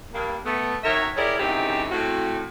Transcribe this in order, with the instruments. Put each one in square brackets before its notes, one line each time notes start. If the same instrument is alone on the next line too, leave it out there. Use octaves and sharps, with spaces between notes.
[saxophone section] G2 A#3
A3 B3
D#3 F#3 A#4 C#5 E5
E4 G4 G#4 A#4 C#5 D5
F#2 C#3 E3 C4 D#4 G4
A2 C4 F#4